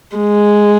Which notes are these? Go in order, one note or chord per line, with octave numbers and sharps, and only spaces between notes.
G#3